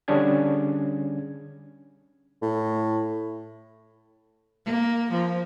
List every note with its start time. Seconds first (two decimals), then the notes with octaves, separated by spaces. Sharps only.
0.08 D3 G3 C#4 D4 G#4 G#6
2.42 A2
4.66 A#3
5.12 F3